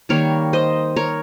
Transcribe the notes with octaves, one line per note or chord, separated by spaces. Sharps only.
D#3 G3 A#3 A#4 C#5
C5 D#5
A#4 C#5